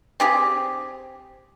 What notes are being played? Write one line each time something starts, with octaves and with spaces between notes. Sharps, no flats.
C4 G4 G#4